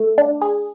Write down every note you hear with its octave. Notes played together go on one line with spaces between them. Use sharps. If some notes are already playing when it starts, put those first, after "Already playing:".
Already playing: A3
D4
G#4